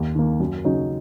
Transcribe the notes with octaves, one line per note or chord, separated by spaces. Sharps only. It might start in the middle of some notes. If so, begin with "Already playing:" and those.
Already playing: D#2
D#3 A#3
F#2
C#3 F#3 D#4